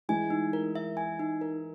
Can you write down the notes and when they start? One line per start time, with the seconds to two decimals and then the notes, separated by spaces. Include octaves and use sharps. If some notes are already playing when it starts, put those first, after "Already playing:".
0.09 E3 G#3 G#5
0.30 D#4
0.53 A#4
0.75 E5
0.97 G#5
1.19 D#4
1.41 A#4